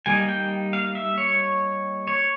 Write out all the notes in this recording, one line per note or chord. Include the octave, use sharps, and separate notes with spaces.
G3 A#3 D#4 G#5
G5
F5
E5
C#5
C#5